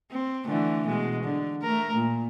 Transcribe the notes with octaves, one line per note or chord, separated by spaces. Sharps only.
C4
D3 E3 A3
B2 G#3
D3
A3 A#4
A#2